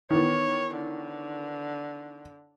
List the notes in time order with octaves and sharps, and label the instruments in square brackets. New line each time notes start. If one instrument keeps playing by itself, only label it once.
[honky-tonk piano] D#3 E3 B3 [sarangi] C#5
[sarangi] D3